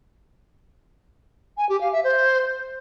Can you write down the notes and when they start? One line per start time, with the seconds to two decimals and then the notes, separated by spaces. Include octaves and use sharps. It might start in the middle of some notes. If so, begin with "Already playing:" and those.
1.57 G#5
1.69 G4
1.81 F5
1.92 E5
2.04 C5